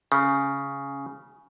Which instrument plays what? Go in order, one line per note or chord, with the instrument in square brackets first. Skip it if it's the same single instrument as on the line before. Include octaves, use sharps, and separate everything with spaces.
[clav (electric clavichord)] C#3